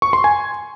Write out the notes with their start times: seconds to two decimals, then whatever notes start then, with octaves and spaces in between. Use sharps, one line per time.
0.02 C#6
0.13 C6
0.24 G#5